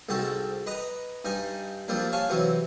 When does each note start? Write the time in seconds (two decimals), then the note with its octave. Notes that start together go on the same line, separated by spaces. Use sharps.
0.09 C2 G#2 C4 F#4 A4
0.66 B4 D#5 A#5
1.25 G2 D#4 G#5
1.88 F3 G3 A#3 C4 D4
2.12 C#5 F5 G#5 A5
2.29 C3 E3 F#3 C4